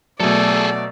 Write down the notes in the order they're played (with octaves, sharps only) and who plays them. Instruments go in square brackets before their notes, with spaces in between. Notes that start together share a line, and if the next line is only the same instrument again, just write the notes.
[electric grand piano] B2 F#3 [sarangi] A3 [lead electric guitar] G#4 A4 [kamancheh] D5